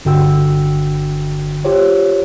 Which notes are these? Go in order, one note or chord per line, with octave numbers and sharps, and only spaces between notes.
G1 D3 F#4 G5 E6
F4 G4 C5 C#5